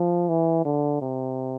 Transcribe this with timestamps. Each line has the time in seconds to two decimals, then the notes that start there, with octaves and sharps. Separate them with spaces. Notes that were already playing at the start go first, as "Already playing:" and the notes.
Already playing: F3
0.29 E3
0.65 D3
1.01 C3